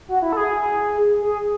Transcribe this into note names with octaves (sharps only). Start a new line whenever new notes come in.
F#4
E4
A4
G#4
G#4